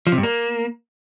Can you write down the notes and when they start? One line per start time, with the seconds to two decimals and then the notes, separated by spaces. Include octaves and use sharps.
0.07 F3
0.12 C3
0.18 G2
0.23 A#3